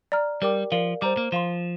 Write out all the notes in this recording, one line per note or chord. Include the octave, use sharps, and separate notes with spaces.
D5 A#5 F6
G3 G4 A#4 D5 G5 D6
F3 A#4 D5 F5
G3 C5 A#5 D6
A#3
F3 C5 F5 C6